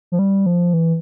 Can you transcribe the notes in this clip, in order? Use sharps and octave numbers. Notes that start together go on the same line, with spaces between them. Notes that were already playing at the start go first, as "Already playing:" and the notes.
F3
G3
F3
E3